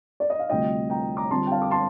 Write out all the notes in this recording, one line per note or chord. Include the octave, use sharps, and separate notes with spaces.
D5
D#5
F5
D2 C3 G3 D4 F4 D#5 G5
G5 A#5
A#5 D6
D3 G3 C4 F4 A5 C6
G5
F5 A5
D6
A5 C6